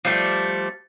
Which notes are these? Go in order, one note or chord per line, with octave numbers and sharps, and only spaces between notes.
F3 G3 A3